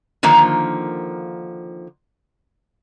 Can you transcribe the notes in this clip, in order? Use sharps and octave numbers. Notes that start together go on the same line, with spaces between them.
D3 D#3 F3 A#3